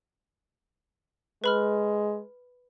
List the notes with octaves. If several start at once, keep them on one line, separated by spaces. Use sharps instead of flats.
G#3 B4 B5 F6